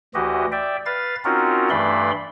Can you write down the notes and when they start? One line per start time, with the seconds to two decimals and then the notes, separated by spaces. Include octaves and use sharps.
0.15 D2 E3 F#4 G4 D#5
0.52 D5 E5 G5
0.86 B4 F5 A6
1.25 C4 C#4 D#4 F4 F#4 A#4
1.70 G2 E3 A3 D5 B5 C6